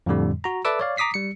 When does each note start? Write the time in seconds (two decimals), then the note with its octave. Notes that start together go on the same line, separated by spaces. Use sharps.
0.06 F2 A2 D3 G3
0.44 F#4 A#5
0.65 A4 B4 D5 E5 D6 E6
0.79 C#5 D5 F5
0.97 A#5 D6 D#6 B6 C7
1.14 G3 C#7